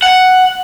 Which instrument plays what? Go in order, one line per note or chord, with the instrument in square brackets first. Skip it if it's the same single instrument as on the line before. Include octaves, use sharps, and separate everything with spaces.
[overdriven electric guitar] F#5